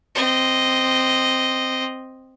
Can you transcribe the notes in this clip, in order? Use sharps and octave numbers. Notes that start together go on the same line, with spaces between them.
C4 D#5